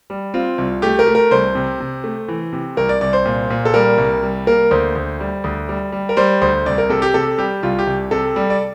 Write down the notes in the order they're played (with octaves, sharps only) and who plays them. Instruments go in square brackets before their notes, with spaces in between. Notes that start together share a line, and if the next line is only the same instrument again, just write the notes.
[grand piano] G3
C4 F4
C2
A3 G4
A#4
A3
A#4
C2 C5
C3
C3
A3
E3
C3
C2 A#4
D5
C2 D5
C5
A#2
A#2
A4
G3 A#4
C2
G3
A#3 A#4
D2 C5
D2
G3
D2
G3
G3
A#4
G3 C5
D2 C5
C2 D5
A#4
C3 A4
G4
C3 A4
G3 G4
C2 F4
G4
C2
C3 A4
G3
D5